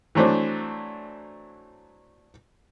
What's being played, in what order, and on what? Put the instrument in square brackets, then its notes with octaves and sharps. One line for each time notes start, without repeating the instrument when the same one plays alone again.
[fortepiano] E3 F#3 A3 C4 D4